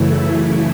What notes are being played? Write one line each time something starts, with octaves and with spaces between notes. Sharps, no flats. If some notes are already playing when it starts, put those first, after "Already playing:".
Already playing: F#2 C#3 E3 A3 E4